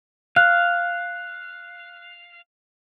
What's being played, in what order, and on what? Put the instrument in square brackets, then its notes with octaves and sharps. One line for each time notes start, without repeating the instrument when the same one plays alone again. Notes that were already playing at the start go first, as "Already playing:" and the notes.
[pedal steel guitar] F5 [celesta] F#6